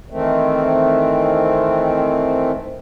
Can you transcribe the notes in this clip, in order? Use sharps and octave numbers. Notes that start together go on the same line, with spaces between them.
D#3 E3 A3 C4